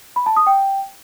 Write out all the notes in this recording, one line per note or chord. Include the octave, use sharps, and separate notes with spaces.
B5
A5
D#6
G5